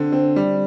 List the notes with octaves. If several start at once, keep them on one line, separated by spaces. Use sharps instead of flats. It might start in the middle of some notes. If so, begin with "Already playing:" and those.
Already playing: D3 C4
C4
G3